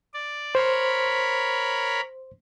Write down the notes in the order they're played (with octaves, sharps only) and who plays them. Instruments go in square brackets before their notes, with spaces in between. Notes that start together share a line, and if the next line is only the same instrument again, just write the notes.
[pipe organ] D5
[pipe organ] A#4 C#5 B5 [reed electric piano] C5 C6